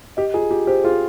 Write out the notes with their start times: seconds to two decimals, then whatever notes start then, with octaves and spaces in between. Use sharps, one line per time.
0.17 G4 D#5
0.34 F4 G#4
0.51 F4 G4
0.67 G4 C5
0.84 F4 G#4